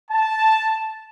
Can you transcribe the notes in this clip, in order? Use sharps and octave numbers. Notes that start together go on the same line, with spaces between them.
A5